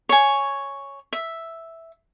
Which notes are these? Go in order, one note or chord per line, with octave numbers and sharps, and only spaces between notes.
C#5 G#5
E5